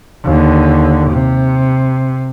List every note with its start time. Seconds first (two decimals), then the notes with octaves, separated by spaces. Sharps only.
0.25 D#2 D3
1.10 C3